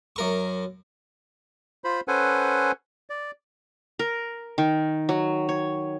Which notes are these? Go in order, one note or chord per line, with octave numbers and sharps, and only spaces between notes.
F#2 A#4 C#6
F4 C5 B5
C#4 A4 B4 C5 F#5 G#5
D5
A#4
D#3
F#3
C#5